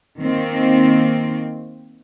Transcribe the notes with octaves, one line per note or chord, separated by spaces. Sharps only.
D#3 A#3 C4